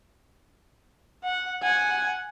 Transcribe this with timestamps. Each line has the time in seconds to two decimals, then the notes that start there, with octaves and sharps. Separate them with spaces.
1.23 F#5
1.62 F#5 G#5